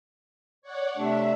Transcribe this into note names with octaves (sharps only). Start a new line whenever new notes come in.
C#5 D5 F#5
C3 A3 D4 E5